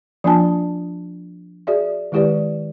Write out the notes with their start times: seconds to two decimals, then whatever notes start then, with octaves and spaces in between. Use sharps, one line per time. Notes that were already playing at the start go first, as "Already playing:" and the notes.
0.24 F3 A#3 D4 F4 G#5 A5
1.67 F#4 G#4 D5 E5
2.12 D#3 G#3 E4 G4 B4 D5